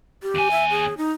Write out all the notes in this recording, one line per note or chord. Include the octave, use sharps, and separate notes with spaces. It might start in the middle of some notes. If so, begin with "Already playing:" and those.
G4
D#2 G#5
E5
G#4
D#4